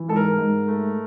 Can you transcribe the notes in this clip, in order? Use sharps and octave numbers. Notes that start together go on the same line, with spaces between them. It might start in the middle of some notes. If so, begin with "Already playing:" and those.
Already playing: E3
G#2 A4
A#4
G#2
A3